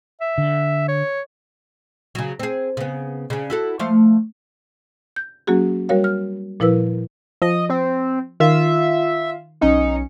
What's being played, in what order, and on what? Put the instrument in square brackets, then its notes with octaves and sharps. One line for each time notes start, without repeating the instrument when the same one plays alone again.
[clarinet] E5
[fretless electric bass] D3
[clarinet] C#5
[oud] C#3 F#3
C4 G#4
C#3 B3
C#3 D4
E4 F#4 A4
F3 A3 F5
[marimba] G6
F#3 A#3 C#4 F#4 G#4
G3 F#4 A#4 C#5 F5
F6
A#2 F3 E4 A#4 B4 E6
[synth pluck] F3 [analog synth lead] D#5
[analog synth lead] C4
[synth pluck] D#3 [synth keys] F4 F5 [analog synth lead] E5
[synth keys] B1 C#4 C#7 [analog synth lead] D#4